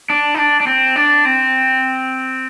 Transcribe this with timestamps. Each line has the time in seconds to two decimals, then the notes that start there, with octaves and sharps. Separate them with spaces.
0.10 D4
0.35 D#4
0.38 D4
0.60 D4
0.67 C4
0.96 D4
1.25 C4